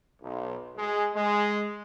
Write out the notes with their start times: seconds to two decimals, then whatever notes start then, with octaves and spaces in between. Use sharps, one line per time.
0.22 B1
0.77 G#3
1.15 G#3